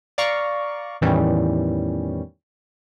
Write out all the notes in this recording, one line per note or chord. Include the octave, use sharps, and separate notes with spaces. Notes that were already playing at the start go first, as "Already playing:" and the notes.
D5 F5 A#5 C#6
E2 A2 D#3 E3 G3 C#4